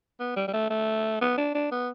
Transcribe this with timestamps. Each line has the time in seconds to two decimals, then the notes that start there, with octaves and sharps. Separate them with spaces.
0.19 B3
0.36 G3
0.47 G3
0.53 A3
0.70 A3
1.21 B3
1.37 D4
1.54 D4
1.71 B3